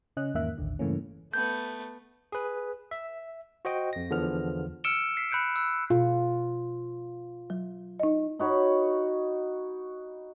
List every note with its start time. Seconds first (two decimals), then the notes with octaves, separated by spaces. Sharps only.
0.17 C#3 C#4 D#5 F#6
0.34 E2 G#2 D#3 A#3 E5 F#6
0.58 A1 D#2 D3
0.79 G2 C#3 E3 A3 A#3 C#4
1.34 A3 B3 G6
2.32 G#4 B4
2.91 E5
3.65 F#4 C5 D#5 G5
3.93 F2 A#6
4.10 E2 D3 F3 B3 F6
4.84 E6 F6 C#7 D7 E7 G7
5.17 B6 C7
5.30 B5 F#6 G6 C#7 D7
5.56 E6 F#6
5.90 B2 F4
7.50 F#3
8.00 D#4 D#5
8.39 D#4 F#4 C#5 B5